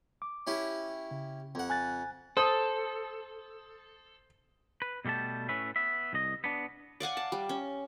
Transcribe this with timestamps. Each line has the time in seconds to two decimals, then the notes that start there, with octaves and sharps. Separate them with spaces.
0.22 D6
0.47 C#4 E4 G4
1.11 C#3
1.55 F2 F#5
1.70 G#5 F#6 A6
2.37 A4 C5 D#6
4.82 B4
5.05 B2 G3 A3 G4 A5
5.49 A2 C#4 B4 E5
5.76 B3 E5
6.13 C2 D#5
6.44 B3 D4
7.00 D5 F5 F#5 G#5
7.17 A5
7.32 G3
7.49 C#4